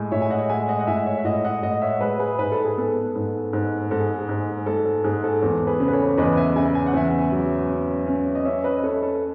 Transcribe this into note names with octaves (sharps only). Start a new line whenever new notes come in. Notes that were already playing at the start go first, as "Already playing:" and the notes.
Already playing: A2 G#3
A2 C#5 E5
G#5
D#5 F#5
G#3 E5 G#5
D#5 F#5
F#5
A2 E5 G#5
C#5 E5
E5
A2 D#5 F#5
D#5 F#5
A2 D#5 F#5
C#5 E5
G#3 G#4 B4
G#4 B4
G#2 B4
A4
G#4
B3 A4
G#2
G#2
G#2 A4
G#4
G#4
G#2
G#2 A4
A4
G#2 G#4
A4
E2 A4
G#4 B4
C#3
B4
A4 C#5
E2 B4 D#5
E5 G#5
C#3 E5 G#5
G#5
F#5
E2 E5 G#5
F#3
C#4
C#4
D#5
C#4 C#5 E5
B4 D#5
C#4 A4 C#5
A4